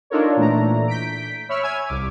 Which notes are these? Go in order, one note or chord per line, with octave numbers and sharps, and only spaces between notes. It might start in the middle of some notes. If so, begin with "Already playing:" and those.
D4 D#4 F4 A4 A#4 C#5
A#2 E3 A3 D4 A#5
G6 B6 D7
C#5 E5 B5 C#6 E6 F6
G#5 E6 F6 G#6
C2 D6